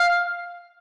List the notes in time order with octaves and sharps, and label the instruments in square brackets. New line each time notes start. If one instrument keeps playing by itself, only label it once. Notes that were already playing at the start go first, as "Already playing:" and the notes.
Already playing: [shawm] F5